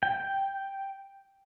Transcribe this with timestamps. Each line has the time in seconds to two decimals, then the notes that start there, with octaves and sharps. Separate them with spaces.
0.03 G5